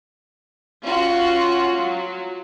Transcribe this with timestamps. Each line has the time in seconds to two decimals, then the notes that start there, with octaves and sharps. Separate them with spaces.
0.85 C#4 F4 F#4
1.76 F#3